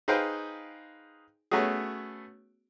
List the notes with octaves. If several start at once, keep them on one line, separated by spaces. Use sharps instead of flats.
D#4 G#4 B4 C5 F5 G5
A3 B3 C#4 F#4 G#4